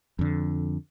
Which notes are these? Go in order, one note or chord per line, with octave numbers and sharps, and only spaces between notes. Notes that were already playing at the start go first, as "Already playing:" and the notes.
F2 D3